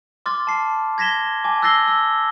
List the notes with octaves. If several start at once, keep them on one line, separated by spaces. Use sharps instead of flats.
C6 D6 F6 A6
A5 C7
G#6 A#6 B6 E7 G7
G#5 A5 D6
E6 F#6 A6 A#6 C7 G7
E6